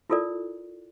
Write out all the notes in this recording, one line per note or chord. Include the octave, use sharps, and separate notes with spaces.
E4 F4 A4 A#4 D5